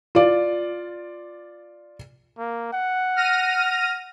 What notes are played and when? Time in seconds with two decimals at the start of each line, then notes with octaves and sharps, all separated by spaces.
0.15 F4 D5
2.38 A#3
2.73 F#5
3.16 F6 A#6 D#7